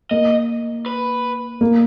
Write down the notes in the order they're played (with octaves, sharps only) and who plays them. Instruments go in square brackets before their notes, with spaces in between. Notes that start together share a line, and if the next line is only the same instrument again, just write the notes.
[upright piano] A#3 [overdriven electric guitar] D#5
[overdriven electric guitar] B4
[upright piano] A#3